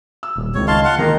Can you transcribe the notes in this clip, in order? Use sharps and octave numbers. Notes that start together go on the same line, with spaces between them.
E6
D#1
C#2 D#3 C4 C#5
D#5 F5 A5 C6
F5 F#5 C6
D#3 A#3 D#4 A#5